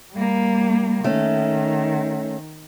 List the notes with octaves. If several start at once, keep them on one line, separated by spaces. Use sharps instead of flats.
G3 A#3
D#3 A3 C#4